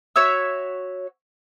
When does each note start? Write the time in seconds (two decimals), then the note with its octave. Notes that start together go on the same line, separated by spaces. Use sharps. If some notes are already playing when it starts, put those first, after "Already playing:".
0.16 F#4 C#5 E5 E6